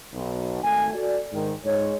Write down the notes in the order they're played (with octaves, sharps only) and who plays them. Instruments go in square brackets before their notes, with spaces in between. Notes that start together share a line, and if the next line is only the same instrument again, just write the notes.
[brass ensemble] B1
G#1 A3 G#5
F#4 A4 D5
G#2 D#3
G#2 G#3 C#5